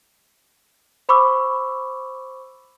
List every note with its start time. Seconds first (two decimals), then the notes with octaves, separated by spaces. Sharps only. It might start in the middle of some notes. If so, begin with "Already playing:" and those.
1.09 C5 B5 C#6 D6 E6